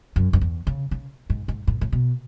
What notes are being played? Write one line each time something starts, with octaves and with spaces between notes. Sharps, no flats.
F#2
F#2
E2
C#3
C#3
G#2
G#2
A2
A2
B2